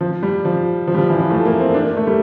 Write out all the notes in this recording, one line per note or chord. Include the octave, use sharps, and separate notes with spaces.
F3
G3
F3
F3
G3
F3
E3
F3
A3
A#3
C4
D4
A#3
A3
G3